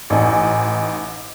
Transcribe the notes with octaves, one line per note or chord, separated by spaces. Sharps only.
A1 D#4 G#5